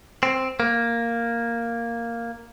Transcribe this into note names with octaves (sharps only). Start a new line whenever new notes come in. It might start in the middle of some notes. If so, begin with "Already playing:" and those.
C4
A#3